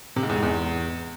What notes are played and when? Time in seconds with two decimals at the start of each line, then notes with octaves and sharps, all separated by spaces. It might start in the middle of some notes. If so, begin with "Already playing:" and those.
0.16 C3
0.23 G#2
0.29 E2
0.36 G#2
0.43 E2